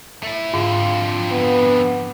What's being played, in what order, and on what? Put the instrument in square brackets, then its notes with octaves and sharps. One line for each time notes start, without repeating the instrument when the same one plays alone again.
[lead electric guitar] A3 E4
[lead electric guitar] F2 D3 [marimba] G#2 [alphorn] F4
[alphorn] B3